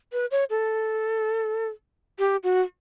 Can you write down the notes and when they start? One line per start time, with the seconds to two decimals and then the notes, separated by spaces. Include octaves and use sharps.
0.13 B4
0.31 C#5
0.50 A4
2.19 G4
2.43 F#4